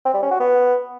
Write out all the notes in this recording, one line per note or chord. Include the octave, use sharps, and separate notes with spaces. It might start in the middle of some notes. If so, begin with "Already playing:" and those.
C4
G3
C#4
F#4
B3